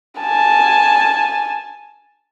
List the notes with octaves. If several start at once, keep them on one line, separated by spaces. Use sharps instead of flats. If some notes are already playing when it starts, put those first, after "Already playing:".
G#5 A5